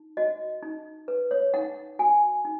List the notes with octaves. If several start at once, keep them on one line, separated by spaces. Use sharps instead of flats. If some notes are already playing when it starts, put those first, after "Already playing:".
Already playing: D#4
F#4 D#5
D#4
B4
C#5
D#4 F#5
F#4 G#5
D#4